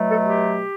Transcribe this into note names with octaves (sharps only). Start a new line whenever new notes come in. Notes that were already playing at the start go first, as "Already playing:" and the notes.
Already playing: B2 F#3 A3
A4
G4